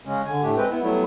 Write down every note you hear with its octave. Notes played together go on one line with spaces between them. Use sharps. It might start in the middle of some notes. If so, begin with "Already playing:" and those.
C#3 G#3 C#4
D3 G#5
A2 A3 D4 G4
G#3 C4 B4 G5
B3 E4
F#3 G3 A3 B3 E4